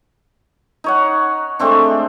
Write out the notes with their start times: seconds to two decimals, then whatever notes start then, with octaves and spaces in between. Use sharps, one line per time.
0.84 D#4 C#5 F#5
1.59 G#3 A3 C4 D4